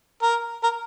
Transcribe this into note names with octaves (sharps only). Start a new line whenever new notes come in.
A#4
A#4